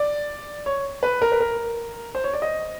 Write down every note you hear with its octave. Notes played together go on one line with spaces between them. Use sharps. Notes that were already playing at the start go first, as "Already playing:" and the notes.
Already playing: D5
C#5
B4
A#4
B4
A#4
C5
C#5
D5
D#5